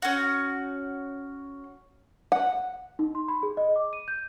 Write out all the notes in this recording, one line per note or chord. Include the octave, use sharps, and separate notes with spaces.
C#4 F#4
F#5
D#4
C6
B5
G#4
D#5
D6
D#7
G6